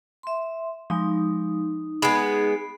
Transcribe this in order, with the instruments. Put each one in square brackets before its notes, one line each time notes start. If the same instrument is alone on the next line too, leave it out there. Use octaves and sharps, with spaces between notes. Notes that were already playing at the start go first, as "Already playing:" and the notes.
[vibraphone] E5 C6
[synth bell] F3 G#3 [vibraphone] D#4
[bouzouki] G#3 B3 [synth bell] B5 C7 D7